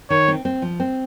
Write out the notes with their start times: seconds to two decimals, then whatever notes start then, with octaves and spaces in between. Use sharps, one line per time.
0.10 D#3 C#5
0.28 C4
0.45 C4
0.62 F3
0.80 C4